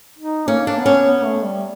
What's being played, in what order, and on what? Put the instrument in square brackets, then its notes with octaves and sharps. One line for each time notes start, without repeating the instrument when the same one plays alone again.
[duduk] D#4
[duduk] A#3 [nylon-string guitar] C#4
[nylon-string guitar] D4
[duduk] B3
[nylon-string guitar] C#4
[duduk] B3
A3
G3